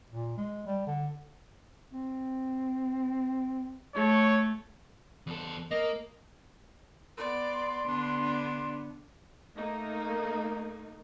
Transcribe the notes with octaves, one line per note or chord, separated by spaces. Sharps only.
A#2
G#3
G3
D3
C4
A3 C#5
E2 A4
A#3 A#4 D#5
B3 D5 C6
D3 B3 D4
D4
A3 A#3 D#4